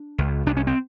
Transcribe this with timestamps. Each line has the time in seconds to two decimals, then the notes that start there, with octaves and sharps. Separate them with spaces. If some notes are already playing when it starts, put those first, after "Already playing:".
Already playing: D4
0.18 C#2
0.46 C2 D4
0.57 C#4
0.67 C4